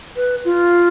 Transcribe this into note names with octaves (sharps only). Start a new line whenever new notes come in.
B4
F4